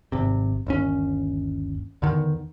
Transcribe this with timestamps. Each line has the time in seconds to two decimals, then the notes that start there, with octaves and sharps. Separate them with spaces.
0.12 G#1 C3
0.67 G1 D#2 C#4
2.02 E2 D3 D#3